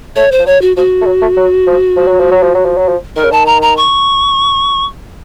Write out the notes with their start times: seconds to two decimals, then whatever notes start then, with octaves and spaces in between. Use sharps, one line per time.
0.16 A3 C#5
0.32 C5
0.40 F3
0.47 F#3 C#5
0.62 F#4
0.77 F3 F#4
1.01 A3
1.06 F#3
1.22 A3
1.37 F#3
1.67 F3
1.96 F3
2.08 F#3
2.20 F3
2.31 F#3
2.43 F3
2.54 F#3
2.65 F3
2.77 F#3
2.88 F3
3.16 D#3 A#4
3.24 C#3
3.32 D#3 A5
3.46 A#5
3.62 A#5
3.77 C#6